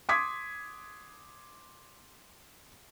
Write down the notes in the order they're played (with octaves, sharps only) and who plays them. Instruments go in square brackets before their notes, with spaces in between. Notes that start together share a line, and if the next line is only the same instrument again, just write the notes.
[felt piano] C6 D6 D#6 G#6 B6